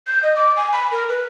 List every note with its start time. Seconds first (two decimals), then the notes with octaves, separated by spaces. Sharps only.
0.07 G6
0.23 D#5
0.36 D6
0.57 G#5
0.73 B5
0.91 A#4
1.09 B4